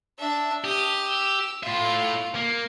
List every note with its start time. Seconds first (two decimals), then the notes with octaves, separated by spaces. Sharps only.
0.19 D4 E5
0.64 G4 D#6 F6
1.07 E6
1.63 A2 F4 E5
2.35 A#3